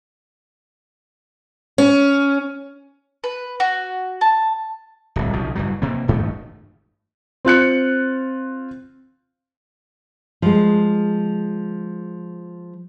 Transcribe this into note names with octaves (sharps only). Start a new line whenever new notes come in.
C#4
B4
F#4
A5
D1 C2
B1 C#3 F3
F#1 G2 F#3
C3 A#3
A1 G2 D#3 A3
C4 F4 F#6 C#7
F3 G#3